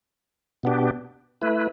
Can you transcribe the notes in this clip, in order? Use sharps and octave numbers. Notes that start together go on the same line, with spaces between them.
B2 B3 D4 G4
A3 E4 B4